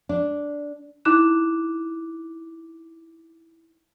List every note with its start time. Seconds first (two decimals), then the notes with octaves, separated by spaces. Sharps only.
0.09 D4
1.05 D#4 E4 D6 F#6 E7